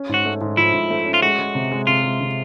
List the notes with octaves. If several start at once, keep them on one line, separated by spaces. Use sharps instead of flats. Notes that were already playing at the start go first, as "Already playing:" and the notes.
Already playing: C#4
G#2 F#4
A3
G#2
F3 E4
G#2
A3
C#4
F4
G#3 F#4
G#3
C3
G#3
C3 F4
G#3
C3